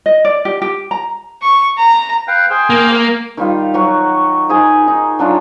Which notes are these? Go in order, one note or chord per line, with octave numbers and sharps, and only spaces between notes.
D#5
D5
G4
G4
A#5
C#6
A#5
B4 F5 G5
G#4 C5 G5
A#3
D#3 G3 F4 F5
F#3 F#4 C#6
D#4 G#4 G#5 C6
D#4
F#3 D4 F4